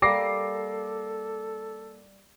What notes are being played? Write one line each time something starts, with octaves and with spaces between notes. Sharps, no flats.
G3 A#3 A4 D6 A#6 C7